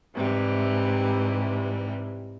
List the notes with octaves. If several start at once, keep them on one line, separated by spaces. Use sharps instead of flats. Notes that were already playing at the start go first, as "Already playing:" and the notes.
G#2 C3 E3 G3